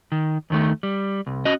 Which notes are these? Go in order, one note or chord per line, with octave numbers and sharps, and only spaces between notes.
D#3
D#2 D#3 A3
G3
C2
C#4 F#4 D#5